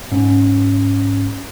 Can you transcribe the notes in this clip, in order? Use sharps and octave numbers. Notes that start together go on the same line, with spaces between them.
G#2 C#4